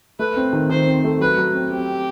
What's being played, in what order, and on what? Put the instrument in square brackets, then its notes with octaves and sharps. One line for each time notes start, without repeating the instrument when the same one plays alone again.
[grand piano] A3 [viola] B4
[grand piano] C4
D#3
[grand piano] D#3 [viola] C5
[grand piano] C4
A3
[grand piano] F#3 [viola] B4
[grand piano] F#3
C4
[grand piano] C4 [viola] G4